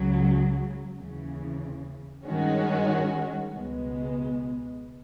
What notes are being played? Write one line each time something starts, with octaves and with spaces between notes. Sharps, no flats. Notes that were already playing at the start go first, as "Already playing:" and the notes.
Already playing: C#2 C#3 F#3
D#2 C#3 E3
G2 D#3 G#3 C#4 F#4
C#2 B2 G#3 B3